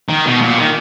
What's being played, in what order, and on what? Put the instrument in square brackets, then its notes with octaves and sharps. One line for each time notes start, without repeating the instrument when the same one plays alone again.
[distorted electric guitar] D#3
B2
A#2
D#3